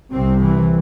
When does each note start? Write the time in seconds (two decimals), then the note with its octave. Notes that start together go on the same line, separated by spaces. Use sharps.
0.13 C2 C3 C4
0.42 E3